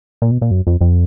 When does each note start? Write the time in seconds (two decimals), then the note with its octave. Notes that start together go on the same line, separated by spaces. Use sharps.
0.22 A#2
0.31 B2
0.42 A#2
0.51 F#2
0.67 F2
0.81 F2